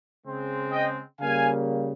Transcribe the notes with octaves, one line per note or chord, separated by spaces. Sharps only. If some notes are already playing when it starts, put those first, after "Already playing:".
C#3 G#3 C4
D#5 G5
C#3 G3 A#3 F5 G#5